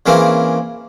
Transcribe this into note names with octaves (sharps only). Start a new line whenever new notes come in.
C#3 E3 A#3 C4